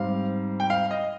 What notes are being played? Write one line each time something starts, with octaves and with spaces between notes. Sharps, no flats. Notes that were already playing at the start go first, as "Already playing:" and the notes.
Already playing: G#2 G3 C4 F5
G5
F5
D#5